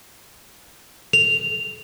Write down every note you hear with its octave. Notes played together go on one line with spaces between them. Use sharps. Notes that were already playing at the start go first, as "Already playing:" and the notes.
F7